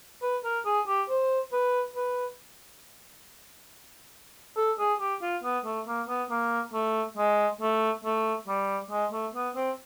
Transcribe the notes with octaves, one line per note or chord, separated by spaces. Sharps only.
B4
A#4
G#4
G4
C5
B4
B4
A4
G#4
G4
F4
B3
A3
A#3
B3
A#3
A3
G#3
A3
A3
G3
G#3
A3
B3
C4